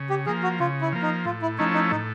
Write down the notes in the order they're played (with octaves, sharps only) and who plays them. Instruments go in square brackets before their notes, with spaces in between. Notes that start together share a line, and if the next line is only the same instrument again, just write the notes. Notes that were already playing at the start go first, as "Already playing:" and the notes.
Already playing: [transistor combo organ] C#3
[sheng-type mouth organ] G4
[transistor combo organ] F3 A#3 [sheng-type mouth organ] G#4
[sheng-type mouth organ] F#4
[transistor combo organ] C#3 [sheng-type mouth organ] F4
[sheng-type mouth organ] E4
[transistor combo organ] F3 A#3
[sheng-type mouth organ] D#4
[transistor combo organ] A2 [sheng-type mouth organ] F4
[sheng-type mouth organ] E4
[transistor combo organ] F3 A3 C#4 E4 [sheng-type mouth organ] D#4
[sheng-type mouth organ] D#4
[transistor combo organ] A2 [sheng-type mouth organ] D#4